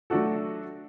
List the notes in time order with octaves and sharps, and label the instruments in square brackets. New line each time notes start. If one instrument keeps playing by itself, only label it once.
[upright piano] F#3 A3 D4 F#4 A4